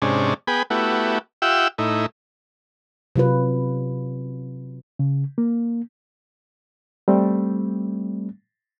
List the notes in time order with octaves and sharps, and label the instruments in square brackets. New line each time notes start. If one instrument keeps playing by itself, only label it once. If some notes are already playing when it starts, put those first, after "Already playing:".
[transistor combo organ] G#2 C3 C#4 D4
B3 G#4 G5 B5
A3 B3 E4 F#4 G4
F4 G4 E5 F#5 G5 E6
A2 D#4 E4
[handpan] C3 F#3 F4 B4
[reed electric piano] C#3
A#3
G3 A3 C4